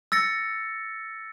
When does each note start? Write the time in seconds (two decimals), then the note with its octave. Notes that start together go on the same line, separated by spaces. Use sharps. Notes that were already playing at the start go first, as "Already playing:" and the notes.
0.12 E6 A6 A#6 C#7